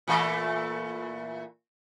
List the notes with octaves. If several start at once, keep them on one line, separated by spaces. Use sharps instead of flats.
A#2 E3 A3